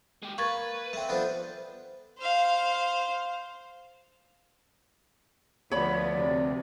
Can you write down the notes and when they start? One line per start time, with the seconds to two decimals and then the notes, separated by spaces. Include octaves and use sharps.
0.22 G#3 G4
0.38 A#3 B4 C#6 G#6 A6
0.93 A3 C4 E5
1.09 F3 B3 D4 A4 C5
2.18 C5 F5
5.71 D2 F3 B3 C#5 D5 B5
6.15 C3